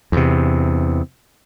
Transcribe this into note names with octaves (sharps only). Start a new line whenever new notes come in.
E2 C3